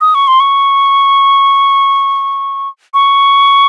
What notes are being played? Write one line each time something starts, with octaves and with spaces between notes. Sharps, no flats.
D#6
C#6
C6
C#6
C#6